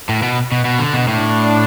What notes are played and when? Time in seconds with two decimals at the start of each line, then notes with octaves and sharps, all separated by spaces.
0.09 A2
0.22 B2
0.52 B2
0.65 B2
0.79 D3
0.93 B2
1.08 A2 D4